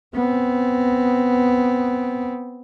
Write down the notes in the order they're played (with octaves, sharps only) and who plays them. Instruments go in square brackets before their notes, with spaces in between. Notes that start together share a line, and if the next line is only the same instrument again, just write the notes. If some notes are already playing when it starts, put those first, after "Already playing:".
[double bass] B3 C4